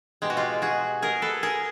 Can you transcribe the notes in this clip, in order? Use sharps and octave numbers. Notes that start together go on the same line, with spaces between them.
B2 G#3 G4
F#4
F4 G4
F#4 G#4
G#4 A#4
A4 B4
G#4 A#4